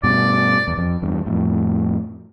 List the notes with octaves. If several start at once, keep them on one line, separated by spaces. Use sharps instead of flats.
G2 B2 D5
E2
F2
E2 G2
F2 A2